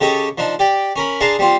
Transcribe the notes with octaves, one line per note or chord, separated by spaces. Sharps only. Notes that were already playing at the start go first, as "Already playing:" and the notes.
C#3 G4 A4 C#5 D#5
F3 D4 D#4
G4 D5 G5
C#4 A#4 B5
D4 G#4 F5 A5 A#5 C6
G3 C4 F4